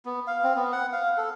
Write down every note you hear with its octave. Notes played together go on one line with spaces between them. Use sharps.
B3
F5
C4
B3
F#5
F5
A4